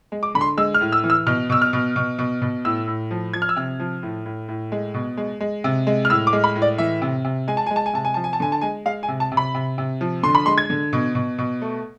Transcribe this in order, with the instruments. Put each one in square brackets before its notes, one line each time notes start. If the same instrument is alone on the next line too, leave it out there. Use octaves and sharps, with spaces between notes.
[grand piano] G#3
D6
D3 B5
C6
G#3 E6
F6
A2
E6
E3
E6
B2 F6
B2 E6
F6
B2
B2
B2
B2
A2 E6
A2
F3
F3 G#6
F6
E6
C3 F6
F3
A2
A2
A2
G#3
B2
G#3
G#3
C3
G#3
F6
A2 E6
D6
G#3
B5
A2
D5
E3 E5
C3
C3
G#3 G#5
A5
G#3 G#5
A5
G#5
C3 A5
G#5
F3 A5
G#5
A5
D3 G#5
A5
G#3 G#5
G#3 F5
G#5
C3
A5
C3
B5
C3
C3
F3
D3 C6
B5
G#3 C6
G#6
D3
B2
B2
B2
A3